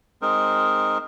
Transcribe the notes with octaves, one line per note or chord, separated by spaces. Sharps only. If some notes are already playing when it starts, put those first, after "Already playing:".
G#3 C4 D#4 A#4